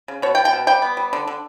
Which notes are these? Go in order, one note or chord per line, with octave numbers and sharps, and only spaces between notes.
C#3
B2 C#5
G5
B2
G5
B2
G3 G5
B3
G3
D3
D3